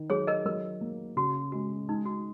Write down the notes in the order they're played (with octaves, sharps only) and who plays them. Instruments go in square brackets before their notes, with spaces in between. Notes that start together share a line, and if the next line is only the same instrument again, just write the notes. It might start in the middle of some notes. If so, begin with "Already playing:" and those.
Already playing: [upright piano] D#3
[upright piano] F#3 [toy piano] G#4 C#5
[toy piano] A#4 D#5
[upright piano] F#3 [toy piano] A#4
[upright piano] A#3
[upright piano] C#3 [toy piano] F#4
[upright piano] G#3 [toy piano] F#4
[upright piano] G#3 [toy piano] D#4
[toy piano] F#4